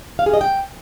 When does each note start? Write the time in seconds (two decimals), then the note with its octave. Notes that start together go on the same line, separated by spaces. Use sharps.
0.19 F5
0.26 G#4
0.34 D#5
0.41 G5